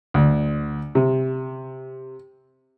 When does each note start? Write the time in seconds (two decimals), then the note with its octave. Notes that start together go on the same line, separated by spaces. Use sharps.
0.14 D2
0.95 C3